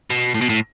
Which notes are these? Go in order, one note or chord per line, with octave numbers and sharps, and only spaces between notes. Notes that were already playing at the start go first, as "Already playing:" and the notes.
B2
A2
B2
A2